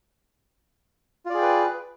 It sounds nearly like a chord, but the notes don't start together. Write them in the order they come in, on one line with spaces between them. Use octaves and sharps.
F4 D5 G#4 G5 B4